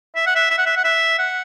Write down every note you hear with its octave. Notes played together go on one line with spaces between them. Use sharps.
E5
F#5
E5
E5
F#5
E5
F#5
E5
F#5